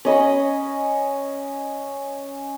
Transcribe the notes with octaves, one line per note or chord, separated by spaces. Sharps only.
C#4 D#5 B5